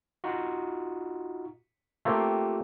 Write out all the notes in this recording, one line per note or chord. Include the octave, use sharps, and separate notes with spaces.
D#4 F4 F#4
A3 A#3 C4 F4 G4